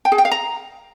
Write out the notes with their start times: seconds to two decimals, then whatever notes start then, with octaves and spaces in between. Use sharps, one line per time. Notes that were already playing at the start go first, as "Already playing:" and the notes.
0.05 G5
0.12 G#4
0.18 G5
0.25 F5
0.31 A#5